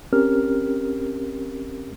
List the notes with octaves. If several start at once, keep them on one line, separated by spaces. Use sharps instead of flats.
C4 C#4 G4 A#4 F6